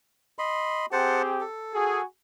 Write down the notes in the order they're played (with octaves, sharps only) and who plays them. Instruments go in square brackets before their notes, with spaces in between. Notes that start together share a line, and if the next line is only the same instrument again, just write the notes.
[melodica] D#5 B5 C6
[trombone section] C4 G4 G#4 [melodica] C5 F#5 A5
[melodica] A4
[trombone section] F#4 G#4